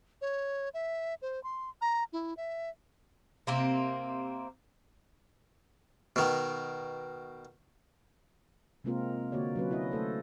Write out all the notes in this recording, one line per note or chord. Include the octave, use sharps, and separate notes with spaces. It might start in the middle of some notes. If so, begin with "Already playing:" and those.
C#5
E5
C5
C6
A#5
E4
E5
C3 A#3 C4
B2 D#3
C3 G#3 A#3 C4 F4 A#4
D3 A#3 F#4 C#5 D5
F#3 C#4 B4
E4 D#5
A3 A4 C5